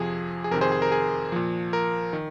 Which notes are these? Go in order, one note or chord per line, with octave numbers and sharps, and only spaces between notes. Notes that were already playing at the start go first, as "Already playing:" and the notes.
Already playing: F2 C3 F3 G#4
G#4
F2 C3 D#3 A#4
G#4 C5
G#4
A#4
G#4
A#2 F3
A#4
D#3